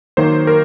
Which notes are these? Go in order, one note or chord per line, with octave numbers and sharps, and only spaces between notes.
D#3 F#3 A#3 C5
A#4